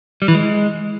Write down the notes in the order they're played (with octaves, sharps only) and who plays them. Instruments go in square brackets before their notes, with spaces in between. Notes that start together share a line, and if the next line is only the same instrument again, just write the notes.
[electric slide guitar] G3
E3
G#3